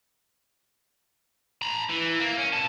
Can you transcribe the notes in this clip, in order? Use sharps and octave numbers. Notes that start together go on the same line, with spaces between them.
A#5 B5
E3
A#3
C#4
B2 A5